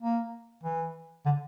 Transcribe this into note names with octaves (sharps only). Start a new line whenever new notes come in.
A#3
E3
D3